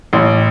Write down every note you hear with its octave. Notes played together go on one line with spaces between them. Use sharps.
A1